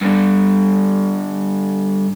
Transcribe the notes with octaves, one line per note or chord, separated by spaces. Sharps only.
G2 D3